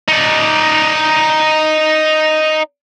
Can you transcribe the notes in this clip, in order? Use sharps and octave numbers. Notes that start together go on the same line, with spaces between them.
D#4 D5